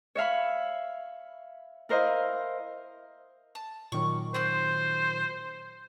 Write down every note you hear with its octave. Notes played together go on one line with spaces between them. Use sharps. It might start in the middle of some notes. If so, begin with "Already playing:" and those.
C#5 E5 F5 B5
E4 A#4 C5 D#5 F5
A5
A#2 D#3 F#3 C#6 D6
C4 F#4 C5 C6